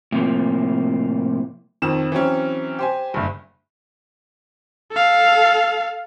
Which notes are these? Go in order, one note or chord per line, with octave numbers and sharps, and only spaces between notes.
A2 C3 F3 A#3
F2 D#3 E7
E3 F#3 C4 C#4
G4 C5 G#5
F#1 G2
A4 F5